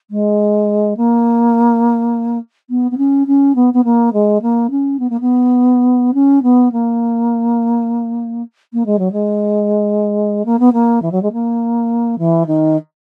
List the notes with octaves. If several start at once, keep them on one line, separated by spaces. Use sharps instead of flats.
G#3
A#3
B3
B3
C#4
C#4
B3
B3
A#3
G#3
A#3
C#4
B3
A#3
B3
C#4
B3
A#3
A#3
G#3
F#3
G#3
A#3
B3
A#3
E3
F#3
G#3
A#3
E3
D#3